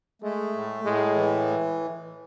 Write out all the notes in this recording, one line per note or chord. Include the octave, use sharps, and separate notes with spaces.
G#3 A3
A2
A2 G#3
E3